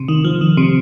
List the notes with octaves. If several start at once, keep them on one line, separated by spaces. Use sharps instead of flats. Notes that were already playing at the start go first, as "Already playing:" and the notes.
Already playing: C3
D#3
F3
D#3
C3